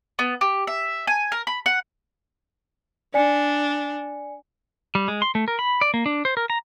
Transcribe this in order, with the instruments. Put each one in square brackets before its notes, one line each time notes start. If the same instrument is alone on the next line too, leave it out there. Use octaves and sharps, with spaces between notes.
[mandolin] B3
G4
E5
G#5
A#4
B5
F#5
[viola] D4 [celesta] D5 G#5 C#7
[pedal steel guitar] G3
G#3
C6
A3
A#4
B5
D5
A#3
D4
C5
A#4
A#5